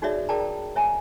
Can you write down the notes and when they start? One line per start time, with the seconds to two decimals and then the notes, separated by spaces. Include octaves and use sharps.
0.02 D#4 F#4 G#4 C#5 D5 E5
0.29 G#4 A#4 D5 G5 A5 A#5
0.76 C#5 E5 G#5 A#5